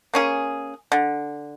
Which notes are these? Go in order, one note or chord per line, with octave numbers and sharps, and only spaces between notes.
A#3 C#4 G#4
D3